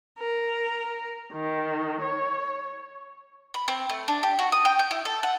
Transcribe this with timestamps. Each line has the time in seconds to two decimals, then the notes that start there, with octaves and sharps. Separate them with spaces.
0.20 A#4
1.33 D#3
2.03 C#5
3.54 B5
3.68 C4
3.90 A3
4.08 D4
4.23 G4
4.39 F#4
4.52 D#6
4.65 G5
4.79 G6
4.91 E4
5.05 A4
5.23 F#5